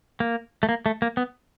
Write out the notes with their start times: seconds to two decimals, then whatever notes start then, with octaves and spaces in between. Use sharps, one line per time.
0.20 A#3
0.63 A3
0.69 A#3
0.86 A3
1.02 A#3
1.17 B3